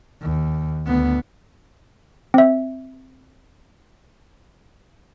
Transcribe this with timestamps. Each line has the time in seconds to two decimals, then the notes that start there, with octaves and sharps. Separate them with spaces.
0.22 D#2
0.87 D2 B3
2.34 C4 E5